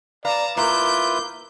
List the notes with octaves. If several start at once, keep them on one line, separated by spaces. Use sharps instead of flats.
B4 D5 F5 A5 A#5
A#3 E4 F4 A#4 B4 D6 G6